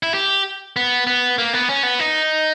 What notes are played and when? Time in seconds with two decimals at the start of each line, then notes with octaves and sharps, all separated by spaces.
0.03 E4
0.14 G4
0.76 B3
1.07 B3
1.38 A#3
1.53 B3
1.69 C#4
1.83 B3
1.99 D#4